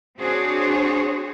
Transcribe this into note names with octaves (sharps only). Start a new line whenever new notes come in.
C4 D4 F#4 G#4 C5 C#5